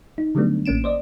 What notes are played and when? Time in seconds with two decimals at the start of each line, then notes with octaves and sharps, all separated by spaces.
0.18 D#4
0.35 D3 F#3 G3 A3 B3 D4
0.66 A1 A#3 C#4 D7 E7
0.84 C5 D5 D#5